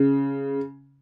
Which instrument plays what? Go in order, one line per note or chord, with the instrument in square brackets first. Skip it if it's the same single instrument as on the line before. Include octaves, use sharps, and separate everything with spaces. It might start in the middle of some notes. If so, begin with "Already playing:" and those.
Already playing: [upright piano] C#3